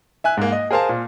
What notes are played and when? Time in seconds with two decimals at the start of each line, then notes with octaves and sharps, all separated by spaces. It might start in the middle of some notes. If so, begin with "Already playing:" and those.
0.24 E5 G#5 F#6
0.37 G#2 A#3
0.52 D#5
0.71 G#4 A#4 C5 F5 G#5 A5
0.89 A#2